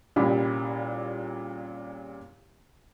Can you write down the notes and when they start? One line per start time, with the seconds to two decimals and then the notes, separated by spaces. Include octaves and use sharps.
0.16 C2 A#2 C#3 G3 B5